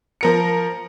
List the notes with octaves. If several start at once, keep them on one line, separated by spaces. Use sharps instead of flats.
F3 A#4 C#7